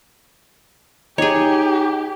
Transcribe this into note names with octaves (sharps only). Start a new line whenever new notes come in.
D#4 G4 G#4 C#5